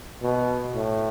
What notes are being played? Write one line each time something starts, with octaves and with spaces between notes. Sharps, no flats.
B2
A2